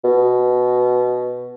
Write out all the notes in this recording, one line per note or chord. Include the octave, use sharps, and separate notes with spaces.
B2